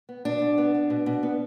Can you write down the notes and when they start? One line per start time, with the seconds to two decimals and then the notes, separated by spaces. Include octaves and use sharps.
0.09 B3
0.25 B2 D4
0.42 B2
0.58 B3
0.74 B3
0.90 B2
1.06 B2
1.23 B3